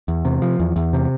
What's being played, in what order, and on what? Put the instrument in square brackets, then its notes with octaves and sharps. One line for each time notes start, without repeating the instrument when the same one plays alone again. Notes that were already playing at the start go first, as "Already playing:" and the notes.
[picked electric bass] E2
C3
F3
E2
E2
C3